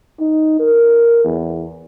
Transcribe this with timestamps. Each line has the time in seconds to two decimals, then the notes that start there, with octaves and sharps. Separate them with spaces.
0.20 D#4
0.59 A#4
1.25 E2